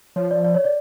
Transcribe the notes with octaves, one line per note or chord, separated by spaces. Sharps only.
F3 C#5
D5
D5
C#5
D5